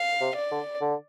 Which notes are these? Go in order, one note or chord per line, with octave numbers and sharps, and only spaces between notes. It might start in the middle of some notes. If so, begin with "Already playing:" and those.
Already playing: F5
C3
D5
D3
D3